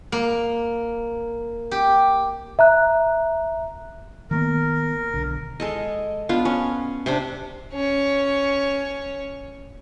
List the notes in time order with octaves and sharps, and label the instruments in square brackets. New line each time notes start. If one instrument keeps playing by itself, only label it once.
[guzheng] A#3
G4
[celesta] E5 A#5 F#6
[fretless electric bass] D#3 A#3 B3 [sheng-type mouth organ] A#4
[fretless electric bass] B1 D3
[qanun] G#3 A4 D#5
B3 D4 F4
C#4
C3 C4 D4
[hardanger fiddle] C#4 C#5